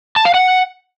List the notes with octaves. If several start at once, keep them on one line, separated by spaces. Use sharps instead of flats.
A5
F5
F#5